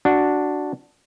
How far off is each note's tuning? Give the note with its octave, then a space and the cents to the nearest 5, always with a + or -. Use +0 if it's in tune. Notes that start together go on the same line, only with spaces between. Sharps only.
D4 +0 F#4 +0